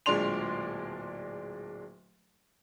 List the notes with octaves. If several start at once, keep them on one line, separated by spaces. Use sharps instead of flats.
D1 A#2 G#3 D4 C6 F7